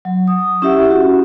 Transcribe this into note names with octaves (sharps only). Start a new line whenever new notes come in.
F#3
D#6
C#4 E4 G4 E5 F#5
F#4